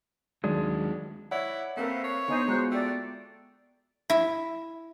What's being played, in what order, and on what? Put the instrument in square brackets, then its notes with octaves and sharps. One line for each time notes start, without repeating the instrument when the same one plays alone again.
[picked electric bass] D#2 D#3 F#3 [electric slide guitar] G#3 D4
[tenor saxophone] E4 [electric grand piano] C#5 D5 F#5
[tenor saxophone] A3 [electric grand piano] A#3 C4 A#4 [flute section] B4 F5
[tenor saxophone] C#5
[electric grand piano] D3 [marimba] B3 [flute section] D#4 C5 G#5
[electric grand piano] G#3 F4 F#4 [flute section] C5 F#6 [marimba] A#5
[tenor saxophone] A3 [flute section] D5 G5
[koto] E4 E5